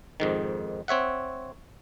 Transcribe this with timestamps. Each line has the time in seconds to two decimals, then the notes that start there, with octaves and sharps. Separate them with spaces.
0.20 F2 G#2 D#3
0.88 C4 C#5 E5 F#5